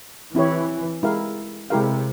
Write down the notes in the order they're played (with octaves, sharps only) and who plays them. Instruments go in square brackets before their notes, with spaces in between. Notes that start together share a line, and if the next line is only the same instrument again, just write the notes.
[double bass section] E3 [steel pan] C4 E4 G4 C#5
[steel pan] G#3 E4 G4 A#4 F5
[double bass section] C3 [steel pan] G#3 E4 G4 A#4 F5